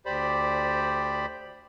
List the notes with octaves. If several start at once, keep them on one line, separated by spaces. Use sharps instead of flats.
D2 G4 C5 D5 B5